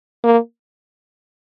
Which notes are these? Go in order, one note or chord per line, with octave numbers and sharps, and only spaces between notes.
A#3